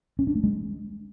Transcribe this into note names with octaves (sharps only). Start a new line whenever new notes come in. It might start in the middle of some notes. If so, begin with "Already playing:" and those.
C#4
D4
A3
G#3